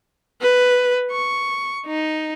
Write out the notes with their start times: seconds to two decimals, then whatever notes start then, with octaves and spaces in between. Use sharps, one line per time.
0.41 B4
1.11 C#6
1.86 D#4